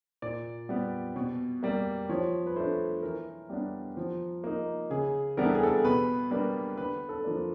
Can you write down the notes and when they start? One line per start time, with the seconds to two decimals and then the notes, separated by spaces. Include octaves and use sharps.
0.22 A#2 D5
0.69 G3 B3
1.16 B2
1.63 G3 A#3
2.09 F3 C#5
2.46 B4
2.56 A3 D4 C5
3.02 E3 A#4
3.50 G3 B3 D4
3.97 F3
4.44 A#3 D#4
4.90 C#3 G#4
5.37 E3 G3 B3 D4 A#4
5.46 A4
5.55 G#4
5.63 A4
5.84 B2 B4
6.31 G3 A#3 D4 B4
6.78 D3 B4
7.09 A4
7.24 F3 A#3 D4